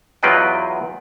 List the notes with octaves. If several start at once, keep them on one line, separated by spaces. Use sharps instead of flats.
E2 F#3 F4 B4 D#5 G5